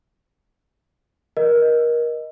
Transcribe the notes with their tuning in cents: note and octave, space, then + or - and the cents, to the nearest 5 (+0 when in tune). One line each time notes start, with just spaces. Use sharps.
A#4 +25 D#5 +0